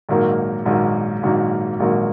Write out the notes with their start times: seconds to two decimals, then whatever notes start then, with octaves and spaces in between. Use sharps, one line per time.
0.09 A#1 G#2 D#3 F#3 A#3
0.66 A#1 G#2 D#3 F#3 A#3
1.23 A#1 G#2 D#3 F#3 A#3
1.80 A#1 G#2 D#3 F#3 A#3